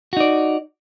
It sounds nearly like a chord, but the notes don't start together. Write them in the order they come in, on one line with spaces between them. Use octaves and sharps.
F#4 D#4 D5